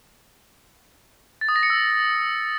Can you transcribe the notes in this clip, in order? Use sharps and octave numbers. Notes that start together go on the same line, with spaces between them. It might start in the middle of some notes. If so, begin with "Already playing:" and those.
A6
D#6
A#6
C#7
E6